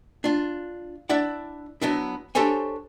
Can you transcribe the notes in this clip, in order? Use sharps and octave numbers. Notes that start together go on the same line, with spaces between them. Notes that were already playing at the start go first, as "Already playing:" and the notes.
D4 F4
D4 E4 D5 F#5
F#3 B3 D4 E4
D4 G4 A4 C5 C#5 G#5